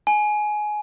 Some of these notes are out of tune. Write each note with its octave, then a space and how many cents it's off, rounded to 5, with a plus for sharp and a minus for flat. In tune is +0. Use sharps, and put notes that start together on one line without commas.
G#5 +20